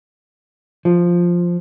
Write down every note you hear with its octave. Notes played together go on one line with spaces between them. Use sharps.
F3